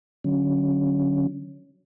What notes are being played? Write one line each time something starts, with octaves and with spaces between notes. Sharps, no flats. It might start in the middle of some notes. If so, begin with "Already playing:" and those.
D3 F#3 C#4